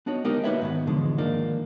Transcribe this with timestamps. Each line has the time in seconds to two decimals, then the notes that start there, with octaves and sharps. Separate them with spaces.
0.06 B3 D4 D#4 F#4 C#5
0.24 G#3 B3 D#4 G4 A#4 D#5
0.44 A#3 D#4 F#4 B4 C#5 E5
0.62 G#2 D#3 B3
0.87 E2 B2 D3 F3 G#3
1.18 D#2 G#2 F3 A#3 D4 D#4